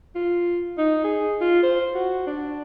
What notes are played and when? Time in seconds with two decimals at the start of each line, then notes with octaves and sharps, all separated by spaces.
0.15 F4
0.78 D#4
1.04 G#4
1.41 F4
1.63 C5
1.95 F#4
2.27 D4